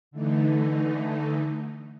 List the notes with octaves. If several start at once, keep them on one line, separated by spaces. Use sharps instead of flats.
D3 E3 A3 D#4